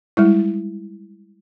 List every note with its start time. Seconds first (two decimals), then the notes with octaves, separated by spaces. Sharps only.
0.17 G3 G#3 E4